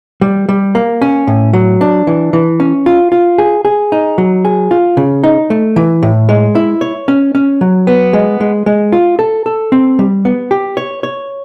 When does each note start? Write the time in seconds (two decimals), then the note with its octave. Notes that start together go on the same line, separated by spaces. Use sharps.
0.21 G3
0.49 G3
0.75 A#3
1.02 C#4
1.27 A2
1.53 F#3
1.81 D4
2.07 E3
2.33 E3
2.60 C#4
2.86 F4
3.12 F4
3.38 G#4
3.65 G#4
3.92 D#4
4.18 F#3
4.45 G#4
4.71 F4
4.97 C#3
5.24 D#4
5.50 A3
5.76 E3
6.03 A2
6.29 G#3
6.55 E4
6.81 C#5
7.08 C#4
7.35 C#4
7.61 F#3
7.87 B3
8.13 G#3
8.41 G#3
8.66 G#3
8.93 F4
9.19 A4
9.46 A4
9.72 C4
9.99 G3
10.25 B3
10.51 G4
10.77 C#5
11.03 C#5